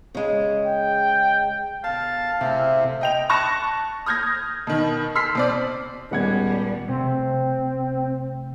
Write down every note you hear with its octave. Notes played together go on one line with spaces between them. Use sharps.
C#3 G#3
G5
B2 D3 F5 A5
C3 A3 E4 G#4 E5
D#5 G5 F7
A5 C#6 F#6 A#6 C#7 E7
D#6 F6 G6 G#6 A#6
B2 D#3
C6 E6 F6 B6 C7
B2 C4 D5
D#1 G3 G#3 B3 C#4 F#5 G#6
C3 A3 C4